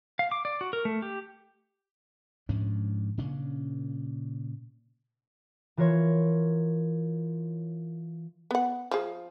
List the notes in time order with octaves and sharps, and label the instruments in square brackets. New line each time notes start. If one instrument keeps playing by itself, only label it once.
[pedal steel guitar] F5
D6
D5
F#4
A#4
A3
G4
[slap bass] G#2 F3 C#4 D4
A#2 C#3 C#4 D4
[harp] E3 F4 A#4 C#5
[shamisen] B3 F#5
F3 G#4